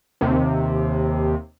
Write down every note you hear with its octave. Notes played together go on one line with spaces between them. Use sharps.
D#2 C3